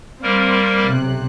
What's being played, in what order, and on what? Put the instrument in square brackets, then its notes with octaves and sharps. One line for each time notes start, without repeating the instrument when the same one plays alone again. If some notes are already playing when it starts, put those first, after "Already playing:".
[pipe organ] G3 A#3 A#4 [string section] C4 C5
[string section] B1 C3 F#6